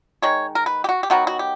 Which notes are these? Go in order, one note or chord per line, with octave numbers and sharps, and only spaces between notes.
D#3 G#3 C#5
A#4
B4
G4
F#4
G4
D#3 F#3 B3 F#4
F#4
G4